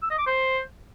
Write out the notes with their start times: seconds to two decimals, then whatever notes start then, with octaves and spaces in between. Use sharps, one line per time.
0.02 E6
0.10 D#5
0.18 D6
0.26 C5